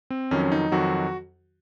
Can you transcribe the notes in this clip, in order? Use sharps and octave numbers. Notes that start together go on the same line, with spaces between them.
C4
F2 D#3 F#3 C#4
C#4
D#4
F2 D#3 F#3 F#4